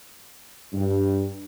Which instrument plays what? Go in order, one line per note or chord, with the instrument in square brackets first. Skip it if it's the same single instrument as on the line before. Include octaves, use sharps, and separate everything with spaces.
[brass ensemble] G2